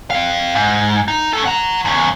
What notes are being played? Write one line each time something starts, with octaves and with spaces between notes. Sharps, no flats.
C4 F5
G#2
D#4
C#4 A4
F#5 A#5
E2 C#3